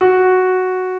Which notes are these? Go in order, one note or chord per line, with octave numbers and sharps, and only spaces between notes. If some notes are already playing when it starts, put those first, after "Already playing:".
F#4